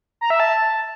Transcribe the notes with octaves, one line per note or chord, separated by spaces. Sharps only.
A#5
E5
A5